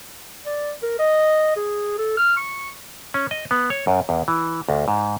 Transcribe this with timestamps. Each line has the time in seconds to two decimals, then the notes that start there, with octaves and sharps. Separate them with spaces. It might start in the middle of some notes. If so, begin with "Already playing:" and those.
0.46 D5
0.83 A#4
0.99 D#5
1.56 G#4
1.98 A4
2.17 F6
2.37 C#6
3.14 C#4
3.31 D#5
3.51 B3
3.70 C#5
3.87 F#2
4.09 E2
4.28 E3
4.69 D2
4.88 G#2